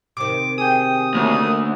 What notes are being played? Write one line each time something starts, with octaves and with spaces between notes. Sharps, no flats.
C3 D#3 D6
G#4 G5 D#6
D2 A#3 C#4